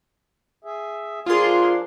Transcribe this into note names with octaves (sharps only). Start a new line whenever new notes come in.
G#4 E5
F3 D4 F4 G#4 A#4 C6